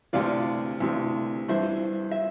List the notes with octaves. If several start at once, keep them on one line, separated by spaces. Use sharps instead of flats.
D2 C3 E3 D5 F5
D2 C3 E3
G2 E3 C5 E5
E5